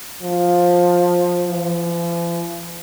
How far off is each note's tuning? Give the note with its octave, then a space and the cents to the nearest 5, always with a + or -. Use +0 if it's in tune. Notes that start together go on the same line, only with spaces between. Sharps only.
F3 +15
F3 -45